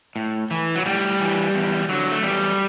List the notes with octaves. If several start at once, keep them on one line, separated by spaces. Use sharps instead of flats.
A2
E3
F#3
A2 G3
E3
E2
D3 F#3
A3
E2 G3